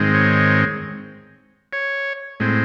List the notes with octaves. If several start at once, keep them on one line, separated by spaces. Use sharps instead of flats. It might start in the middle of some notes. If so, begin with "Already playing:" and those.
Already playing: G#2 D#3 G#3 C4
C#5
C#5
A2 G#3 C4